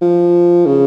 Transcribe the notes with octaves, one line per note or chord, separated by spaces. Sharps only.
F3
C#3